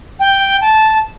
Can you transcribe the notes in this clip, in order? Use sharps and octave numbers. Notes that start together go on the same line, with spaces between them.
G5
A5